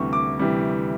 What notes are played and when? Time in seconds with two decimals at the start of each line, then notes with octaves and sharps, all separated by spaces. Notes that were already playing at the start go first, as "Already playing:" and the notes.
Already playing: D2 C3 E3 G3 C#6
0.13 D6
0.39 C3 E3 G3